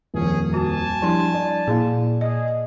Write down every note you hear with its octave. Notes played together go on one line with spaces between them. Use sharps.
D#1 F2 C#4 G#4
F#4 G#5 A5
F3 G3 D4 E4 C6
D5
A#2 A#3 E4 G#4
G#4 D#5